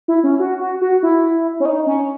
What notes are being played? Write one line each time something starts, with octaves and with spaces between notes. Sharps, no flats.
E4
C#4
F#4
F#4
F#4
E4
C#4
D#4
C#4